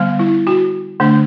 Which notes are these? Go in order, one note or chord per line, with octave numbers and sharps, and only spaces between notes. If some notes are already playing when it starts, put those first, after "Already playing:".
Already playing: D3 G3 B3
E4
F#4
D3 A3 D4